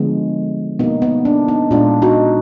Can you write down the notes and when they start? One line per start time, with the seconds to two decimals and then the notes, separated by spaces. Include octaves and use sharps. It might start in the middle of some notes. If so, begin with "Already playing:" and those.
Already playing: D3 F3 G#3 B3
0.79 B2 A#3 B3 D#4
1.02 B3
1.25 D4
1.48 B3 D#4
1.71 A#2 G#3 B3 D4 F4
2.02 D#4 F#4